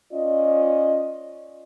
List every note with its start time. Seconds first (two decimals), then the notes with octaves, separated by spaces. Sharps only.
0.13 C#4 F4 D5 D#5